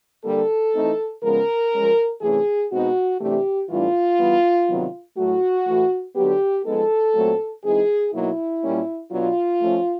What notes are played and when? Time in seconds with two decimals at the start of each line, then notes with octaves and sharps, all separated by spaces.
0.24 D3 G3 A#3 D4 A4
0.74 E3 A3 C4 D#4
1.23 C#3 F3 G#3 B3 A#4
1.72 F3 G#3 C#4
2.21 C3 E3 A3 C#4 G#4
2.70 B2 G#3 C4 D#4 F#4
3.20 C3 E3 A3 D4 G4
3.69 A2 E3 G3 B3 D4 F4
4.18 E3 G3 B3
4.68 C3 D#3 F#3 B3
5.17 A2 F#3 A3 F#4
5.67 A2 E3 A3
6.15 D3 F#3 B3 G4
6.64 F3 G#3 B3 D#4 A4
7.14 A#2 F#3 A3 C4
7.63 E3 G#3 C4 D#4 G#4
8.12 B2 F#3 A#3 D#4 E4
8.62 A#2 G3 A#3 C#4
9.11 B2 F#3 B3 D4 F4
9.60 F3 A3 C#4